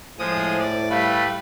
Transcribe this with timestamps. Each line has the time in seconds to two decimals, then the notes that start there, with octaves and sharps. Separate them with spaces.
0.19 A2 F3 G#3 C5 D#6
0.60 D5
0.90 G3 A3 B4 F5